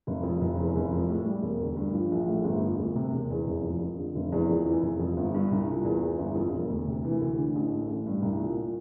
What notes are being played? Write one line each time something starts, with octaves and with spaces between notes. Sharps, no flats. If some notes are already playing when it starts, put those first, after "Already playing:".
F1
F2
F1
E2
F1
F2
A2
G3
E1
D2
G2
F3
A#1
A2
G1
F2
D2
C3
E1
E2
F1
F2
F2
D3
F1
E2
F2
E3
F1
F2
G1
G2
C2
A#2
E2
E3
G1
F2
E1
D2
C3
E3
D2
D3
A1
A2
A1
G2
C2
A#2
A#2